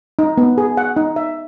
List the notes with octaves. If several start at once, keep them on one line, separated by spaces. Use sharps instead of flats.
D#4
B3
G#4
F#5
D#4
E5